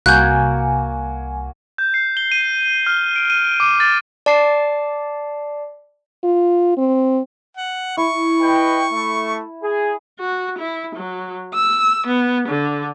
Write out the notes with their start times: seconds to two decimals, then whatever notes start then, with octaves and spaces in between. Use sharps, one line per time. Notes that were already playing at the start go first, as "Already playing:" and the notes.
0.06 C2 A#3 F#4 G#5 F#6 G6
1.78 G6
1.94 C7
2.17 G7
2.32 D#7
2.87 F6
3.16 D7
3.30 D#7
3.60 D6
3.80 A6
4.26 D5 A5 D6 C7
6.24 F4
6.78 C4
7.57 F#5
7.97 E4 C#6
8.41 B4 D#5 G5
8.92 A3
9.63 G#4
10.19 F#4
10.59 E4
10.96 F#3
11.54 E6
12.07 B3
12.49 D3